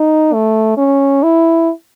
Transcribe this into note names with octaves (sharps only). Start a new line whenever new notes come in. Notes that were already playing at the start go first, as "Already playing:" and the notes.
Already playing: D#4
A3
C#4
E4